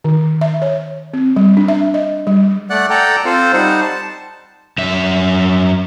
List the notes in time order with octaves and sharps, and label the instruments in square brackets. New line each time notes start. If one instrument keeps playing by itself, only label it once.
[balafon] D#3
E5
C#5
C4
G3
D4
E5
D#5
G3
[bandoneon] A3 D5 F#5 F#6
A4 D5 F#5 G5 A#5
C4 F4 A4 C5
G3 D#4 C5 F#5
A5
[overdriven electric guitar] F#2 E5